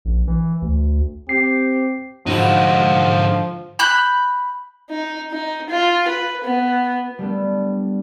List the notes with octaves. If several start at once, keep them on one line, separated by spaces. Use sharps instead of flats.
A#1
E3
D2
C4 G4 C7
G#2 D3 F3 D#4 E4 F#4
B5 F#6 G6
D#4
D#4
F4
B4
B3
G3 A3 B3 D4